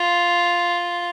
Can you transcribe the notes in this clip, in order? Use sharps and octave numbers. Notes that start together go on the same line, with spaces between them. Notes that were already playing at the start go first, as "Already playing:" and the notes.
Already playing: F4